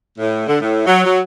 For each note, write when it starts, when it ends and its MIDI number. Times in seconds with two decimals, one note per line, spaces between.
0.18 0.44 45
0.47 0.57 50
0.60 0.83 45
0.87 1.04 54
1.04 1.20 54